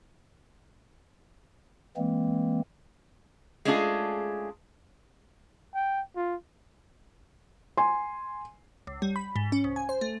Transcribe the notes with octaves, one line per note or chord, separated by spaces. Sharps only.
E3 G#3 A#3 C4
G#3 A3 C#4 D4 F4 G#4
G5
F4
G#5 C6
C#2
G3
B5
G#2
C#4
C2
G#5
C5
A3